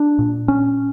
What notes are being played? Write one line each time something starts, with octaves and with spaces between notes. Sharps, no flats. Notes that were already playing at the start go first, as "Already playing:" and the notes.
Already playing: D4
A#2
C#4